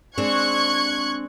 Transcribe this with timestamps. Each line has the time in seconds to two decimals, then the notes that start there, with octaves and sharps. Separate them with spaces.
0.18 G#3 C4 D4 C#6 F#6 G#6